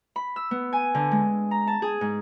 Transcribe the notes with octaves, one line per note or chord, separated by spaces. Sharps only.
B5
E6
B3
G#5
D3
G#3
A#5
A5
G#4
G#2